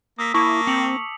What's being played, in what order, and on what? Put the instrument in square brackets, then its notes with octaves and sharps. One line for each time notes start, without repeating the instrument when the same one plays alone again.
[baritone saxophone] A#3 [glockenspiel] D#6 E6 B6
[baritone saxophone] A#3 [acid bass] E4 [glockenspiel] A5 D6 [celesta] C#6
[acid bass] C4 [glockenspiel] C#7 F7 F#7